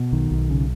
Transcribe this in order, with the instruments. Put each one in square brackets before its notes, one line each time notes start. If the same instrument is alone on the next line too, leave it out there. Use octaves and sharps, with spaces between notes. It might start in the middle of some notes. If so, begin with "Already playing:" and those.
Already playing: [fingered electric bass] B2
B1 D#3
B1
C#3